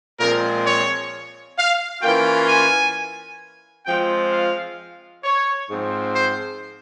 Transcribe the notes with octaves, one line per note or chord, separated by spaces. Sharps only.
A#2 F3 G#3 C4 A#4
C#5
F5
E3 A#3 C#4 F4 G5
G#5
F3 G#3 C4 F4 G5
F5
C#5
G#2 F3 C4
C5